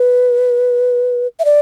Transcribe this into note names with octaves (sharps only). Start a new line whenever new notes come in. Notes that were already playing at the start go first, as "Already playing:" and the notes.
Already playing: B4
E5
D5